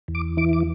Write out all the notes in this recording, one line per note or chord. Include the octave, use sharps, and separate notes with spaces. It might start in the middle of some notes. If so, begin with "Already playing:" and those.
E2
D6
E3 D6
D6